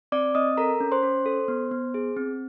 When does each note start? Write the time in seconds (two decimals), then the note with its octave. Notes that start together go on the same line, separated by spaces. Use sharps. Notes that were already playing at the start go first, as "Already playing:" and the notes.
0.12 C4 D5 D6
0.35 C4 D#5 D#6
0.57 A4 A#4 A#5
0.80 C#4
0.92 C5 C6
1.03 C#4
1.26 A4
1.48 B3
1.71 B3
1.94 G#4
2.17 C4